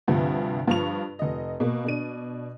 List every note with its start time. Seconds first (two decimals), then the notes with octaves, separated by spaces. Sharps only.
0.08 D2 G2 C3 F3
0.67 G2 F3 F4 C#6 F7
1.19 F1 D#5
1.60 B2 A#3
1.85 B2 D4 D#7